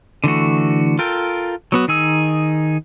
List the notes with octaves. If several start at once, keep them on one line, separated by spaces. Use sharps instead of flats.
D3 E3 A3 F#4
F4 A4 A#4 G5
F#3 B3 F#4
D#3 D#4 G#4 E6